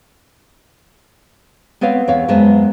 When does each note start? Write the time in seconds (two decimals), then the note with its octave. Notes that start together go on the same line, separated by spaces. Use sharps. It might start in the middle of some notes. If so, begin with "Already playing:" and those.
1.81 B3 C4 B4 C#5 F5
2.08 E2 C#5 F5
2.28 F#2 G#3 B3 C5 A5